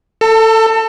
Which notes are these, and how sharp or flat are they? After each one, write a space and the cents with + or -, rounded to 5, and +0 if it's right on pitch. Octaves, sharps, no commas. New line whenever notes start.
A4 +15 A5 +45